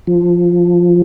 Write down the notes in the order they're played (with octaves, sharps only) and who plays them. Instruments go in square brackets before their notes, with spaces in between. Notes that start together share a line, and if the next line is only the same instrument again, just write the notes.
[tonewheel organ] F3